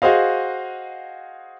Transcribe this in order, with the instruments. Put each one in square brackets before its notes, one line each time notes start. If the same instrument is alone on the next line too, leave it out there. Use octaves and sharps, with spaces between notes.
[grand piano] F#4 G#4 C5 D#5 F5